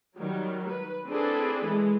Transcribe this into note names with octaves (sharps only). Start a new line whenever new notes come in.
D#3 F#3 G3
B4
C4 D4 E4 G#4 A4 B4
E3 G#3